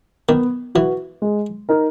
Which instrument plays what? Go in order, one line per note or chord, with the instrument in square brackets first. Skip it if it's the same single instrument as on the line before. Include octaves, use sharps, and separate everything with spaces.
[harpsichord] D#3 [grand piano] B3
[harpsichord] E3 [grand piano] F#4 B4
[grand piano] G#3
D#4 A#4